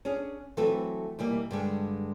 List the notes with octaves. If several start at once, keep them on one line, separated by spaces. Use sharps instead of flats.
C#4 D4 G#4
E3 F#3 A3 C4 A4 B4
B2 E3 G3 A#3
G2 D3 G#3